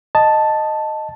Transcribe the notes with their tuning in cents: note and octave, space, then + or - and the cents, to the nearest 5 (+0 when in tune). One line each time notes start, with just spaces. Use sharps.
D#5 -5 A5 +0